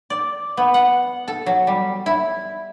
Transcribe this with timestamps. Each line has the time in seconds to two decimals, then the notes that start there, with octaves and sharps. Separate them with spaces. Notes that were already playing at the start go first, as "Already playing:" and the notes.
0.10 D5
0.57 B3
0.74 F#5
1.28 A4
1.46 F#3
1.67 G3
2.06 E4